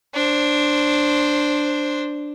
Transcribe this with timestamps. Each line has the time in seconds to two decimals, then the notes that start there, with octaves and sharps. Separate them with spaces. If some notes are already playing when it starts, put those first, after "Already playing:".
0.14 D4 C5